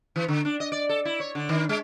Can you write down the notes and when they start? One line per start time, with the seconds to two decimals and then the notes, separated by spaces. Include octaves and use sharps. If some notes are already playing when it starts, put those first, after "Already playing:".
0.16 E3
0.28 D3
0.45 D4
0.60 D#5
0.72 D5
0.89 A4
1.05 E4
1.20 C#5
1.35 D3
1.49 D#3
1.69 G#3